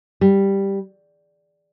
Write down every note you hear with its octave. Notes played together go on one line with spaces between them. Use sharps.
G3